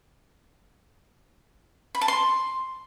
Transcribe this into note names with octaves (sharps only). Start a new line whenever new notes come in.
B5
A5
C6